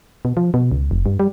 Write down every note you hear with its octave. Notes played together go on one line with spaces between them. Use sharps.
B2
F3
B2
C#2
F1
G2
G3